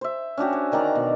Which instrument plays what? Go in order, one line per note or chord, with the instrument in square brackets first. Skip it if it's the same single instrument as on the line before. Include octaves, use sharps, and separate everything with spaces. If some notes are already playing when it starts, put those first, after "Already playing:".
[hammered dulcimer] C5 E5
C#4 D4 F#4 G4
G#5
D3 D#3 D5 A#5
B2